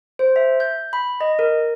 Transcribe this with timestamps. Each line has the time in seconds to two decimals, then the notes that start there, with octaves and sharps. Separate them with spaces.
0.19 C5
0.36 E5
0.60 G6
0.93 B5
1.21 D#5
1.39 A#4